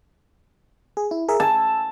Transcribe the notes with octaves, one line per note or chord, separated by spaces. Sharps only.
G#4
E4
G#4 A#4 E5
G#5 A5 E6